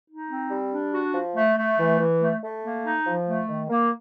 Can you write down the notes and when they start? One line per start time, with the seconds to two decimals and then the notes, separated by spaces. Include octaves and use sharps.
0.08 D#4
0.29 C4
0.51 G3
0.71 D4
0.93 F#4
1.14 F3
1.36 A3
1.57 A3
1.78 E3
1.99 E3
2.21 A3
2.42 A3
2.64 A#3
2.84 D#4
3.06 F3
3.27 A3
3.48 D#3
3.69 A#3